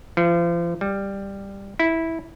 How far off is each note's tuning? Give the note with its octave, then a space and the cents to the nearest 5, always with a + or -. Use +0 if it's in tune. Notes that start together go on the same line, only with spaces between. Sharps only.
F3 -35
G3 +10
E4 -10